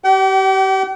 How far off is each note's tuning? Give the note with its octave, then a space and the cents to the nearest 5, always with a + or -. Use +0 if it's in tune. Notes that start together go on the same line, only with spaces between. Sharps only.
G4 -30 G5 -45